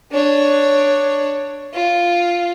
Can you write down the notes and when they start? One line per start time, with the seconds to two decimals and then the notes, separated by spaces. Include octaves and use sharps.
0.12 D4 C#5
1.74 F4